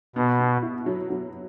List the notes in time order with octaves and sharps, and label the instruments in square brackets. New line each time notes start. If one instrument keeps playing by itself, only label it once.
[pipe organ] B2 [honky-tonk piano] B3
[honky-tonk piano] B3
E4
F#3
F#3